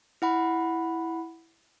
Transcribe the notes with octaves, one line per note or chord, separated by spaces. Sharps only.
E4 F#5 B5